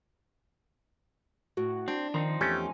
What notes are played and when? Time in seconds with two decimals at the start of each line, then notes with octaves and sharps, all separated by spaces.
1.57 A2 F#4
1.88 C4 D4
2.14 D#3 F3 C4 D#4 A#5
2.41 E2 A3 C#4 G4 G#5